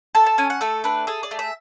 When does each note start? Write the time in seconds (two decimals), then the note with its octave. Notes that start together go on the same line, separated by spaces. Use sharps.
0.15 A4 A5
0.26 A5
0.38 C#4 G#5
0.50 F#5
0.61 A3 A4
0.84 D4 B4
1.07 G#4 A4
1.23 D5
1.31 A3
1.39 E5